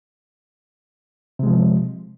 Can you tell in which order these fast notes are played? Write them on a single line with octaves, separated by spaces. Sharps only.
C3 G#3 F3